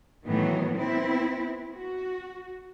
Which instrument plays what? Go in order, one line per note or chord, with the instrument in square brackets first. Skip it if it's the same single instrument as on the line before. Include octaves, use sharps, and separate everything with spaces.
[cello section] A2 D#3 E3 F#3 B3
B3 C4 E4
F#4